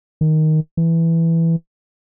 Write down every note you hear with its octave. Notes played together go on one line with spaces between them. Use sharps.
D#3
E3